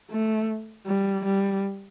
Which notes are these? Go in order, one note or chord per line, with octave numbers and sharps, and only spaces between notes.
A3
G3
G3